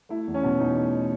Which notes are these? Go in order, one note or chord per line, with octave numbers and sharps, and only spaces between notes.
A3 E4
E2
C#4
B2
E2 D#4
A3